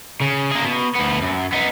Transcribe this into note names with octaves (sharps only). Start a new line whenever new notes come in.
C#3
A#3 G#4
B2
D2 B3
F#2
B3 D#4